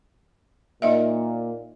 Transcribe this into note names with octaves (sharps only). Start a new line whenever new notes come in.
A#2 D#4 D#5 E5